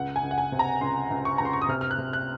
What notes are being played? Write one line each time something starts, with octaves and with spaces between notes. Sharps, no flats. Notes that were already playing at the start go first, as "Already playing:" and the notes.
Already playing: C#2 F#5
G#5
C#2
F#5
G#5
C3
A#5
C#2 C6
C#2
C#6
C#2 A#5
C6
C#6
D#6
C3 F6
F6
F#6
C3
F#6